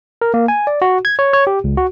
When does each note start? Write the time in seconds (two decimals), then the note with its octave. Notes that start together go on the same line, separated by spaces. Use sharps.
0.22 A#4
0.34 A#3
0.48 G#5
0.67 D5
0.82 F#4
1.05 G#6
1.19 C#5
1.33 C#5
1.47 G4
1.64 C#2
1.77 F#4